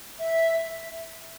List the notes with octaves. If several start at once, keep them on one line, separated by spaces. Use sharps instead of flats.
E5